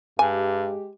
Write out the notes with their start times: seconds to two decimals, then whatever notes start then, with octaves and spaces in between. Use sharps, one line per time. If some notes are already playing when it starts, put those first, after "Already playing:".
0.19 G2 G#3 G4 G#5